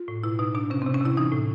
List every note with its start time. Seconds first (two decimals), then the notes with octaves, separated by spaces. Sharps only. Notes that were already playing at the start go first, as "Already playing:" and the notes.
Already playing: F4
0.08 A2
0.24 B2 E4
0.39 B2 D#4
0.55 B2 D4
0.70 C3 C#4
0.82 C3 C4
0.94 C#4
1.01 C3 E4
1.17 E3 D#4
1.32 A2